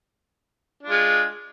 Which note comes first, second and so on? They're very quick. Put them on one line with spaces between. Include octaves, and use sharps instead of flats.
D4 F4 G#3